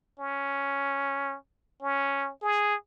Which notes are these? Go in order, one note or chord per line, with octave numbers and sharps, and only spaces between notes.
C#4
C#4
G#4